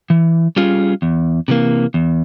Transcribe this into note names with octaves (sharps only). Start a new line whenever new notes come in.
E3
G3 C#4 F4 G#4
E2
C3 E3 A#3
E2